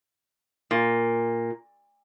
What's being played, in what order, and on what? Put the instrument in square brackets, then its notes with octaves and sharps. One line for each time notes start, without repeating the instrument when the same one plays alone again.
[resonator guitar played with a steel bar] A#2